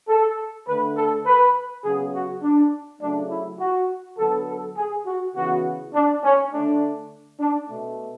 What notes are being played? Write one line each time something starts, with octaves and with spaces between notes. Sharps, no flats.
A4
D3 A3 B4
A4
B4
C#3 F#3 B3 G#4
F#4
D4
C#3 F#3 A3 D4
E4
F#4
D3 F#3 B3 A4
A4
G#4
F#4
C#3 E3 B3 F#4
D4
C#4
D3 A3 D4
D4
B2 A3